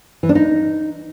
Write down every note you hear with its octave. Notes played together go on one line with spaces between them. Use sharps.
E3
D4
D#4